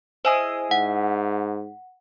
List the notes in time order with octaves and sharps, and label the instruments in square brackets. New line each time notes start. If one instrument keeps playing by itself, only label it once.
[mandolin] E4 G#4 D#5 [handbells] C5
[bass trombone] G#2 [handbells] F#5